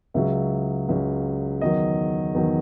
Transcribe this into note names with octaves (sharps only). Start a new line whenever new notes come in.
C#2 C#3 F#3 E5
C#2 C#3 F#3
E2 D#3 F#3 D#5
E2 D#3 F#3